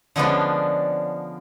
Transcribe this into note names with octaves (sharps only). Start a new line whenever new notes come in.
D3 F3 G#3 B3 C#4 D4